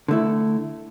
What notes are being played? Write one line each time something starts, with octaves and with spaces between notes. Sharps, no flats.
D3 A3 E4